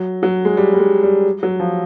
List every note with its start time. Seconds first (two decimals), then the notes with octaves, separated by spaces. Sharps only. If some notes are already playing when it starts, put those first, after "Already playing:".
Already playing: F#3
0.23 F#3
0.45 G#3
0.57 G3
0.73 G3
0.79 G#3
1.03 G3
1.43 F#3
1.60 F3